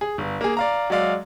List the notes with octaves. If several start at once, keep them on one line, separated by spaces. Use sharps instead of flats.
G#4
G1
A#3 G#4
D5 F5 A#5
F#3 G#3 D5 F5